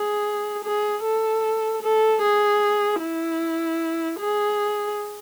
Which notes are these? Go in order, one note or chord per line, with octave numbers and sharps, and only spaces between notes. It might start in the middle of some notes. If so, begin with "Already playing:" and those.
Already playing: G#4
G#4
A4
A4
G#4
E4
G#4